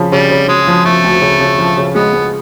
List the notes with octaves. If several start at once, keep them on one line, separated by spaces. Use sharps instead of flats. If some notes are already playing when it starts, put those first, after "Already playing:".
Already playing: C#3 F3
C#3 G3
C#3
C#3 G#3
F3
F3 A3
D2
C#3
C#3
F3
C#3
G#3 B3
G#3